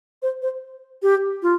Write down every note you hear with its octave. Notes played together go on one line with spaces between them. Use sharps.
C5
C5
G4
F4